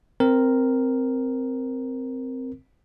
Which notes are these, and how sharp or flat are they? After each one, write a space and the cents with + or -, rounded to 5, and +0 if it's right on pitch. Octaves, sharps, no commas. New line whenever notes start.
C4 -5 A#4 +0